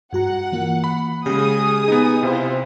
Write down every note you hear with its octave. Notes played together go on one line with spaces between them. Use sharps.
G2 F#4 F#5 A#5
E3 A#3 F4
B5
C#3 G#3 G4 G#4 G#5 D#6
B3 D#4
C3 E4 F4 C5